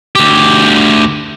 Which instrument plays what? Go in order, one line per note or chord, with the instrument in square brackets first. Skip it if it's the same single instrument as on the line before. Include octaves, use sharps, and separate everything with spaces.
[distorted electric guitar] D2 G4